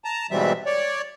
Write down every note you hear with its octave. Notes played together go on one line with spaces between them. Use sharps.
A5 A#5
G#2 B2 E3 G3 C4 E5
C#5 D5